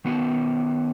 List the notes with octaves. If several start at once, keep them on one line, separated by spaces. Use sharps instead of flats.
D#3 B3 F#4